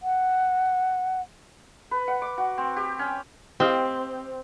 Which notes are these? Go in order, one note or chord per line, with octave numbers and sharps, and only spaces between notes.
F#5
B4
F#5
D6
F#4
C4
G4
C#4
C4 G4 D#5 F5